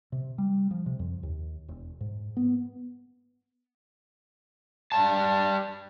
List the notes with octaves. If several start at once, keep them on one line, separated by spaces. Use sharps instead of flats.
C3
G3
F3
C3
F2
D#2
E1
G#2
B3
G3 A5